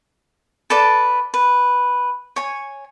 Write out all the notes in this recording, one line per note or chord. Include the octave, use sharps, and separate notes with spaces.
A4 B4 D5 A5
B4
C#5 G#5